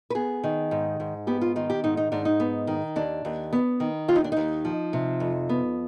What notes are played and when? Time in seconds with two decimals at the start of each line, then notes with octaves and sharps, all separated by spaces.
0.10 B4
0.15 B3 G#4
0.44 D#3
0.71 G#2
1.00 G#2
1.27 B3 G4
1.41 F4
1.56 D#3 F4
1.70 G4
1.84 G#2 D#4
1.97 D#4
2.12 G#2 D4
2.25 D#4
2.40 B3
2.67 D#3
2.96 D#2 D4
3.25 D#2
3.53 B3
3.80 D#3
4.08 D#2 F4
4.16 D#4
4.24 D4
4.32 D#2 D#4
4.65 F3
4.93 C3
5.20 F2
5.49 B3